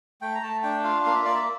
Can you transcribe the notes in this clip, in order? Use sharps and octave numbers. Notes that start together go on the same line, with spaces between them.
A3 G5
A#5
A3 A5
D4 G5
F4 F5
A#3 F5
E5
A#3 D5
E5